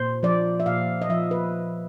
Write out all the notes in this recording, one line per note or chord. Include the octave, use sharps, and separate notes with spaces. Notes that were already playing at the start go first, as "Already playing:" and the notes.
Already playing: A#2 C5
F3 D5
E5
A#2 F5
D#5
F3 E5
B4